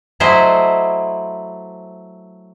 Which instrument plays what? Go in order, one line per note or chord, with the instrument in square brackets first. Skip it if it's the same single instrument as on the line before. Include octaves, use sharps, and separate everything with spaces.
[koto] F#3 A3 E4 C5 D#5 E5